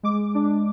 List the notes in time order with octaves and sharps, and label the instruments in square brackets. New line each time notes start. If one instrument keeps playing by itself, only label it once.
[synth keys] G#3 D6
D4